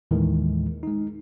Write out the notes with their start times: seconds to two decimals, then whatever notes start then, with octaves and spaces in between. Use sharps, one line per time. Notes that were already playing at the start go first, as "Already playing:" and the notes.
0.11 D#2 A2 D#3 E3 G#3
0.83 G#3 D#4